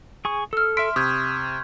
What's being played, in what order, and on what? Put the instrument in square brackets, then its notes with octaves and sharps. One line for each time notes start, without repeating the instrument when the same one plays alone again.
[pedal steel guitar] G#4 C#6 D#6
[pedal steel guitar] A4 [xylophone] E6 F6
[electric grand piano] E5 B6 [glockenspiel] C6 F6 [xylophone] D7
[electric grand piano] C3 [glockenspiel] C#6 G6 G#6 [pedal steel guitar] D#6